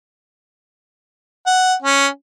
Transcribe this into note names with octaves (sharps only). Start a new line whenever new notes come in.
F#5
C#4